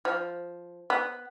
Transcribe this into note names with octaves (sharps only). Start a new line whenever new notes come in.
F3
B3